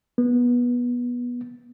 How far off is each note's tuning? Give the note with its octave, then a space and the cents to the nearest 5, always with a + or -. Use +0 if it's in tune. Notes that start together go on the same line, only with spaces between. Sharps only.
B3 -20